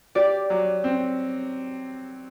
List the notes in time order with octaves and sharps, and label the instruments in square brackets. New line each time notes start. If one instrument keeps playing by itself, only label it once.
[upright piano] G4 [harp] D5
[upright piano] F#3
C4